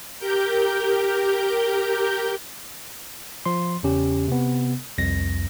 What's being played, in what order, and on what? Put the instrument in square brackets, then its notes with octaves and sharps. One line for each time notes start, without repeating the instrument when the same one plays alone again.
[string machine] G4 A#4 G6
[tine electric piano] F3 C6
E2 C#3 C#4 G4
C3 B3
C2 F2 A#6